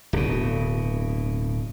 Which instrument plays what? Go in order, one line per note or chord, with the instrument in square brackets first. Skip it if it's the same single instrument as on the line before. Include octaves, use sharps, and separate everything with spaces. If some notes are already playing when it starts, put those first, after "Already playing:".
[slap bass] D1 B2